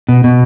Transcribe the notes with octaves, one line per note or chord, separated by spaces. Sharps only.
B2
B2